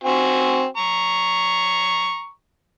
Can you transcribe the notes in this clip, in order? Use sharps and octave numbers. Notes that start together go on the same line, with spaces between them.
C4 F#4 G#5
A#5 C#6